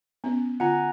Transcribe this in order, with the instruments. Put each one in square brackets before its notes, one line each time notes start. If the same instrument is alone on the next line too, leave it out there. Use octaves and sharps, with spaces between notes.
[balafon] B3 C#4
[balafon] D3 F4 [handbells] F#5 G#5 A#5